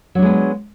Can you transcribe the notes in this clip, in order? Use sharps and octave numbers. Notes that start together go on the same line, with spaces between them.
F#3 G#3 B3 D4